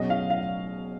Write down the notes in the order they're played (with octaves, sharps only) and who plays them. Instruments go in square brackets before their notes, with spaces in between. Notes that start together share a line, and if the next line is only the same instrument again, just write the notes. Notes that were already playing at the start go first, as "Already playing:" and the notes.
Already playing: [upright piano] B2 F#3 C#4 G#4 [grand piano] D#5
[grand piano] F5
F5